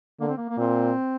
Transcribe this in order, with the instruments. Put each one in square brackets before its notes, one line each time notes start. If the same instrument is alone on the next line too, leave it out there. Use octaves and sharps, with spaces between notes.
[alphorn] D3 [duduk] A#3
[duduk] C4
A#3
A#3
[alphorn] A#2 [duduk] C4